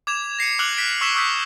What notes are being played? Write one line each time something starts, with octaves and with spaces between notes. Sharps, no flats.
D6 G#6 E7 F7
A#6 C7 C#7 D#7
D6 F6 F#6 D7 F7 F#7
B6 D7
C#6 E6 B6 E7 G7
C#6 D#6 E6 G6 B6